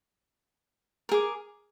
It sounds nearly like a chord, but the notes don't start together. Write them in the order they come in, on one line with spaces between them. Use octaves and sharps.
A#4 G#4 D6